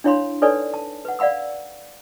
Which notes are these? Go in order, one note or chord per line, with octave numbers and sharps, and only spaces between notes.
D4 E4 C#5 F5 B5 C6
D#4 A4 B4 C#5 D5 G#5
A5
B4 F#5
D5 F5 F#5 B5 E6